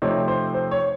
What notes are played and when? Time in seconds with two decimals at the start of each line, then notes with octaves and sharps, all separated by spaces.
0.02 C3 F3 A3 C4 D#4 C#5
0.28 C5
0.54 C5
0.71 C#5